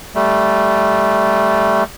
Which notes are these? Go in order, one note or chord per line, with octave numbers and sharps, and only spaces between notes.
G3 A3